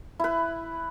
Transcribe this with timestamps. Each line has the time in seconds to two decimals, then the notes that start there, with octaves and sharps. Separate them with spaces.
0.19 E4 B4